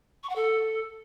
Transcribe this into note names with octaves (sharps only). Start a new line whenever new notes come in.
C#6
F#5
A4